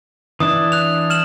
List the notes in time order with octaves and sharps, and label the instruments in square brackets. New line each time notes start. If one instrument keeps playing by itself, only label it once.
[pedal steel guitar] E3 D4 E4 [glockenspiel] D#6
[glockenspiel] F#6 F7
F6 E7 F#7